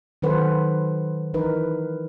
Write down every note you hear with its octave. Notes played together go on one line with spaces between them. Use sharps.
D#3 F#3 A4 B4 C5 F#5
E3 D#4 A#4 B4